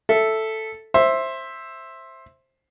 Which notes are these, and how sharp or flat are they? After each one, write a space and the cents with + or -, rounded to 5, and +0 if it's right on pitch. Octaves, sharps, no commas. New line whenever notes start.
A4 +0 E5 +0
C5 +15 E5 +0